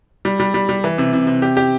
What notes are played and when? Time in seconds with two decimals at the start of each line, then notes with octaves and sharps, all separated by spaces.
0.25 G3
0.40 G3
0.54 G3
0.69 G3
0.84 E3
0.98 C3
1.13 C3
1.27 C3
1.42 G4
1.57 G4